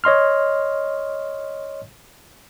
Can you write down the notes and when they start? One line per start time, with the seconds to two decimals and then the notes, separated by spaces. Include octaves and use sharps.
0.04 C#5 D#5 C6 F6